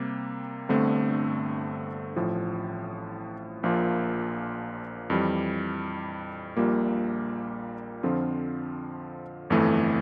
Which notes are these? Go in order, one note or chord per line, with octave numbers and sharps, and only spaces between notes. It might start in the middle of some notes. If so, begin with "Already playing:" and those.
Already playing: C3 G3 A#3
G1 G2 D3 A3 C4
A1 A2 F3
A#1 A#2 F3 A#3 F4
F2 E3 G3
A#1 A#2 G3 A#3 F4
F2 D3 F3 C4 F4
G1 F2 E3 A3